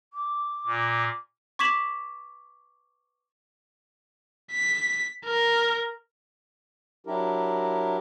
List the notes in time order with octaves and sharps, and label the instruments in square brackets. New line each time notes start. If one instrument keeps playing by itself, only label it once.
[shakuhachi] D6
[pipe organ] A#2
[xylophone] C#6 D6 G#6 B6 E7 F#7
[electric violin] B6
A#4
[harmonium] F#3 D4 E4 G4 A#4